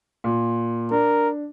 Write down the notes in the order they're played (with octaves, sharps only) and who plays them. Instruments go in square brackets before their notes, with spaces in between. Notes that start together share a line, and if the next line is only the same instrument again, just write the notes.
[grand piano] A#2
[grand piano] D4 [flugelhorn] A#4